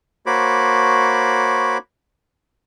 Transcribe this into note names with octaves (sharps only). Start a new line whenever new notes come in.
A#3 F#4 C5 C#5 B5 D6